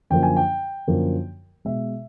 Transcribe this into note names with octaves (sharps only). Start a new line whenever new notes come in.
F#2 D3 F3 A#3 G5
G#5
G5
F#2 D3 F3 A#3
B2 G#3 E5